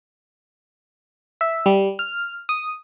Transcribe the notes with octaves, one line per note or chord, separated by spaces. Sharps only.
E5
G3
F6
D#6